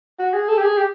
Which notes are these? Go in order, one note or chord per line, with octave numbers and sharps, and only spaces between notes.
F#4
G#4
A4
G4
G#4
G4